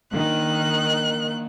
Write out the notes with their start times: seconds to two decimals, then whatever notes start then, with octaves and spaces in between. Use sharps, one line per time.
0.13 D#3 A#3 D4 F#6